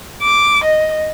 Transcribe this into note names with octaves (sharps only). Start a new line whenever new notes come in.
D6
D#5